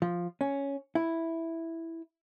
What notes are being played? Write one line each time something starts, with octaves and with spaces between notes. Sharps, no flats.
F3
C#4
E4